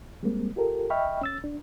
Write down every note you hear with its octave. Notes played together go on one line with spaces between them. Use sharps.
G3 G#3 A#3 C4
F4 G4 A4 A#4
D#5 E5 G5 B5 C#6 F6
C#4 E6 A6
D4